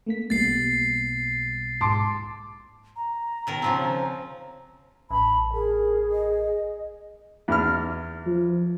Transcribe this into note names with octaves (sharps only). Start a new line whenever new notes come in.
A3 A#3 B6
B1 G3 A#3 B3 A6 C7
G#2 A5 C6 D6
A#5
B2 D#3 A#4
C#3 F3 C4
A1 A5 B5
G#4 A#4
D#5
E2 F6
F3